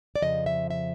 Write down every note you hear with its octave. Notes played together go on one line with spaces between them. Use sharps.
D5
F2 C#3 F3 D#5
E5
E5